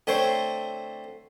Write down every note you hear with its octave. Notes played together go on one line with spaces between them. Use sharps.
D3 A3 C4 C5 C#5